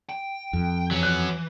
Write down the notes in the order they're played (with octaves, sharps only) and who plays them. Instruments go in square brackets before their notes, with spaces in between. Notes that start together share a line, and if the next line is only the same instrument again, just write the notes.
[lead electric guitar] G5
[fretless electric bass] F2
[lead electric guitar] E3 [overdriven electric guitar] F#3 C#4
[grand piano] F#6